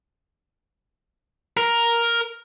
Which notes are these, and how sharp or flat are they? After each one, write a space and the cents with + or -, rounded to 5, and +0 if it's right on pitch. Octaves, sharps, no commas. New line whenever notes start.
A#4 +5